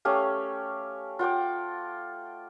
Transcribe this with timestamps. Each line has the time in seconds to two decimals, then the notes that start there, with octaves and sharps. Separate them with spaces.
0.05 A3 C#4 G4 F5
1.19 F4 F#5 G5 D6